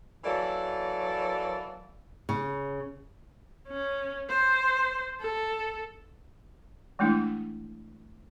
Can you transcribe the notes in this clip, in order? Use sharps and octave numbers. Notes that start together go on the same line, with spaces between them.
E3 F#3 A#3 A4 D5
C#3
C#4
C5
A4
E3 G#3 A3 D4 E4